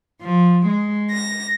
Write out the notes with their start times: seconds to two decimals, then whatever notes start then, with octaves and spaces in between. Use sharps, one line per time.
0.22 F3
0.66 G#3
1.11 A#6